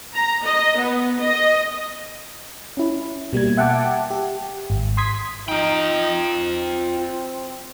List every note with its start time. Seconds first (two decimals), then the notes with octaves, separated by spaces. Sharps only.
0.14 A#5
0.43 D#5
0.79 B3
1.21 D#5
2.77 C#4 E4
3.33 B2 G3 A#3 G#6
3.57 E5 F#5 G5 A5 D6
4.10 G4
4.70 G#1
4.97 C6 D#6 G#6 B6
5.48 D#4 F4 G5
6.33 C4